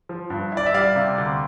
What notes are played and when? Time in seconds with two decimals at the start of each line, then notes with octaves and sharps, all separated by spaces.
0.09 F3
0.30 G2
0.52 E4 D5
0.66 E5
0.74 G3 D5 F5
0.96 C3
1.18 D2